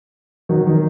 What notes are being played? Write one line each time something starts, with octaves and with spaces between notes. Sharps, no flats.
D#3 F#3
D#3